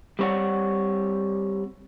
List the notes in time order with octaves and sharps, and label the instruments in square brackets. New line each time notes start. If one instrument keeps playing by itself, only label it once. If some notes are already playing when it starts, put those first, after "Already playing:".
[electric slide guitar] G3 C4 C#5 D5 F#5